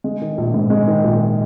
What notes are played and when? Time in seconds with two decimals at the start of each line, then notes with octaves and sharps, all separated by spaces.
0.04 G#3
0.22 D#3
0.38 A#1
0.54 G#2
0.70 G#3
0.88 D#3
1.04 A#1